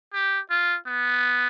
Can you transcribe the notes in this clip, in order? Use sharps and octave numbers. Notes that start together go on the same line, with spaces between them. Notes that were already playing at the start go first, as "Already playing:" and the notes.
G4
F4
B3